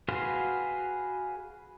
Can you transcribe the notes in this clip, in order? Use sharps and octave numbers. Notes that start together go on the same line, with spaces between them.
F#4 G#4 B4 F5 C6